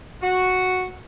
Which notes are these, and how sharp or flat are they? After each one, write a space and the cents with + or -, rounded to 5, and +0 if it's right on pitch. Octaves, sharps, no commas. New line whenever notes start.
F#4 -5